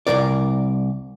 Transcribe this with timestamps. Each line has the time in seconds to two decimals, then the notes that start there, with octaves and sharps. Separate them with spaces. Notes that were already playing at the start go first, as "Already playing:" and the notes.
0.07 C2 A#2 A#4 D5